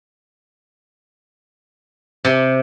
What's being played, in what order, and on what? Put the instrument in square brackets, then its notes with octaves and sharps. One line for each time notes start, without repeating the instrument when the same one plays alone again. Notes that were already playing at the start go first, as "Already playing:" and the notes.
[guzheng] C3